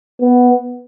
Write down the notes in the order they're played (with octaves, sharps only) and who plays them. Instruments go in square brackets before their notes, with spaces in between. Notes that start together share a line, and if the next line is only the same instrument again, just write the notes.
[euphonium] B3